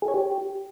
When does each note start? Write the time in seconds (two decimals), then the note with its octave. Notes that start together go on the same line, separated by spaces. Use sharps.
0.02 G#4
0.08 C#5
0.14 G4